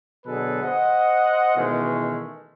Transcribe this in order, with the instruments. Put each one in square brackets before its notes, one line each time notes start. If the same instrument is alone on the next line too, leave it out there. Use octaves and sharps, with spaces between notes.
[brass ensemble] B2 D3 F#3 G#4 A4 B4
C5 D#5 F#5
B2 D#3 E3 G#3 A3 C#4